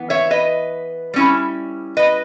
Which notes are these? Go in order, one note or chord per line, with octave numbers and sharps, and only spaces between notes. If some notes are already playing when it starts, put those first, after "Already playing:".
Already playing: E3 B3
C#5 E5
B4 D#5
G3 C#4 E4
B4 D#5